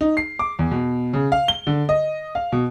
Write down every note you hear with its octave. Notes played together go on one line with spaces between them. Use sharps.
D#4
C7
D6
E2
B2
C#3
F5
G7
D3
D#5
F5
B2